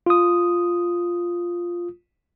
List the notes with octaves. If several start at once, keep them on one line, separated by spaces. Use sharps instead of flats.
F4 D#6